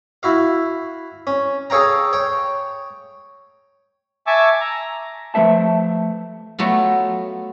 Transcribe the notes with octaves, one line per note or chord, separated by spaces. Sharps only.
E4 F#4 F5
C#4
G#4 A4 C#5 F5 G5 A#5
C#5 G5
E5 G#5 A5 C#6 D6 E6
A#5
F3 A3 B4 E5 A5
F#3 A3 B3 F4